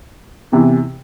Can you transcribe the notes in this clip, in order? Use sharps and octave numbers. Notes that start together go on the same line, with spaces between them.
E2 C3 E3